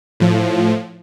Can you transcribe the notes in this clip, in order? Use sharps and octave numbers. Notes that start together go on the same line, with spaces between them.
A2 F3